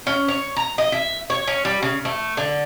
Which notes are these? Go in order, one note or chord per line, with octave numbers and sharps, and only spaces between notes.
C#4
C#5
A#5
D#5
E5
C#5
C#4
G3
C#3
A3
D3